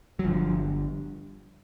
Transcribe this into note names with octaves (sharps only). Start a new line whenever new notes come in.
F#3
G1 G2 D3 F3